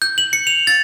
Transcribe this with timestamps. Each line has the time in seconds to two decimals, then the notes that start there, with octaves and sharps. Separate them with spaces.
0.02 G6
0.18 F#7
0.33 C#7
0.47 F7
0.67 A6